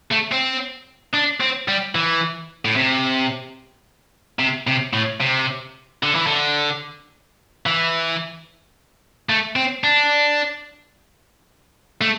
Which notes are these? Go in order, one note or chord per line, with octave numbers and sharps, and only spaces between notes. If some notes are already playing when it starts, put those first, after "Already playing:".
A3
C4
D4
C4
G3
E3
A2
C3
C3
C3
A2
C3
D3
E3
D3
E3
A3
C4
D4
A3